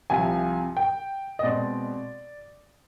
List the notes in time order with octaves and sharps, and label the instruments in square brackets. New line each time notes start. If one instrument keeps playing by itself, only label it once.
[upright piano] C2 C3 F3 G#5
G5
D#5
B2 G#3 C4 D5